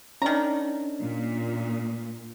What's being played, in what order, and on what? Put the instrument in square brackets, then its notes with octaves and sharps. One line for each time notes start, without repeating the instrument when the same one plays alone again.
[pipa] D#3 A#5 [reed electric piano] C#4 D4
[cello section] A#2